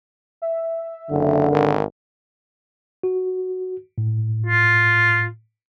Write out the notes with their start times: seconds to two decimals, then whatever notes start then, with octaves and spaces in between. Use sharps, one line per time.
0.42 E5
1.10 F#1 D3
1.51 G#1 A#4
3.03 F#4
3.98 A2
4.46 F4